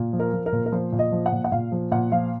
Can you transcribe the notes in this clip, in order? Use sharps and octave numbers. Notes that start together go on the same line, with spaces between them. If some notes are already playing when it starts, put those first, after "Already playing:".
Already playing: A#2
F3
A#4
F3
A#4
A#2
A#4
F3 C5
A#2
D#5
F3
F#5
A#2
F#5
A#2 F5
F3
A#2 F#5
F3 F5